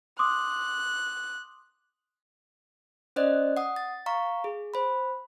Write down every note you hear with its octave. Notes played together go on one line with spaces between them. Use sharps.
C6 D6 D#6 F#6
C#4 C5 D5 D#5 F#6
F#5 D#6
A6
F5 A#5 C#6
G#4
C5 B5